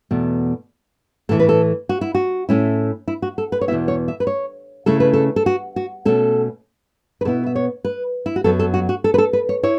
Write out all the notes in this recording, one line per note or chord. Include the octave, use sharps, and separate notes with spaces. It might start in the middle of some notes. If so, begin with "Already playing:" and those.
E2 B2 A3
A2 E3 A3 E4 A4
B4
A4
F#4
E4
F#4
A2 A3 C#4 E4
E4
F#4
A4
B4
C#5
E2 B2 B3 E4 E5
C#5
E5
B4
C#5
C#3 A3 C#4 E4 A4
B4
A4
A4
F#4
F#4
B2 A3 C#4 A4
B4
B2 B3 E4 A4
E5
C#5
B4
E4
F#4
F#2 F#3 B3 A4
A4
F#4
F#4
A4
B4
A4
B4
C#5
E4 C#5